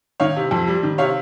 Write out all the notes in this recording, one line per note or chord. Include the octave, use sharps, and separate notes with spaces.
D#3 C#5 F5
C3
F2
G3
D#3
C3 C#5 F5